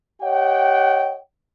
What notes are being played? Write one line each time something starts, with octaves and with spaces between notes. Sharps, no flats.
G4 C#5 D#5 F#5 G5